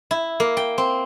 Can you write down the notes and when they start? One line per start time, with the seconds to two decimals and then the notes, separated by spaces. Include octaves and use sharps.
0.11 E4
0.40 A#3
0.57 G5
0.78 C4